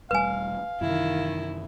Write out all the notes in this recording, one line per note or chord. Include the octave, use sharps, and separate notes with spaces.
E1 G3 A3 B4 F5 G#5
F#2 C3 D#3 E3 E4